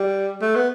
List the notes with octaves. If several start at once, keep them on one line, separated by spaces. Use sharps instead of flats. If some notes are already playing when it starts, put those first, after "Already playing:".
Already playing: G3
A3
B3